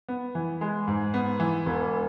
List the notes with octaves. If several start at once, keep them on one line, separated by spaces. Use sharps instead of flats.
B3
E3
G#3
G#2
B3
E3
E1